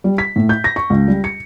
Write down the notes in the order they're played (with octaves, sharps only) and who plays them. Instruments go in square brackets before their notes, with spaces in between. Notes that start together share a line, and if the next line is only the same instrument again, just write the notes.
[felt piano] G3
B6
A2
G6
A#6
C#6
C#2
G3
C#7